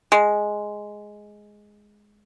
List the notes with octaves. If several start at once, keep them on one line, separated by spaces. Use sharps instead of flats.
G#3